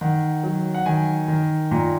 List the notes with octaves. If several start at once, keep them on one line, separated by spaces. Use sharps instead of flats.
D#3 F#5
F#3
F#5
D#3 G#5
D#3
A#2 A#5